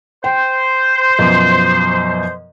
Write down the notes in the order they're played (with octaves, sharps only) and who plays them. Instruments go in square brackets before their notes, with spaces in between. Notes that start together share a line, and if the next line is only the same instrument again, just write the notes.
[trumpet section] C5 [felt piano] G5
[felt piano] F#2 B2 F3